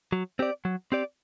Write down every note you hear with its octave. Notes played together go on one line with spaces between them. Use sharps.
F#3
C4 G4 D5
F#3
C4 G4 D5